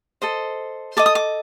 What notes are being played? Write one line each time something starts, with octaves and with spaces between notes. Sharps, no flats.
A4 C5 D#5
A4 D#5 D6
D#6
D6